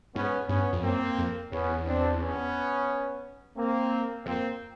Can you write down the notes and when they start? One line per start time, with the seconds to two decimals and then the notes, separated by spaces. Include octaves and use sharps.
0.15 G#2 B3 C#4
0.49 G2 B3 C#4
0.73 F2
0.83 F#2 A#3 C4
1.18 F2
1.52 E2 B3 C#4
1.86 C4 D4
2.21 B3 C#4
3.57 A#3 C4
4.26 F2 A#3 C4